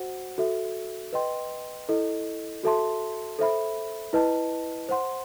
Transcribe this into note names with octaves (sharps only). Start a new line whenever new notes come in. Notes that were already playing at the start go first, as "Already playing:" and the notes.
Already playing: F#4 C5 F#5
F#4 A4 E5
B4 D#5 G5 C6
E4 A4 D#5
F#4 A4 E5 A5 C6
A4 C5 E5 B5
E4 B4 D#5 A5
C5 F#5 C6